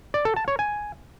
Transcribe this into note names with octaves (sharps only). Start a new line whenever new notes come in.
D5
A4
A5
C#5
G#5